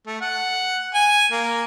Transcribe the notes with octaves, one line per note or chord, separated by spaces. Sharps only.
A3
F#5
G#5
A#3